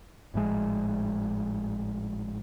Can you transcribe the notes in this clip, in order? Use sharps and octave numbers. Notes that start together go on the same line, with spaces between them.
G#1 A2 F3 G#3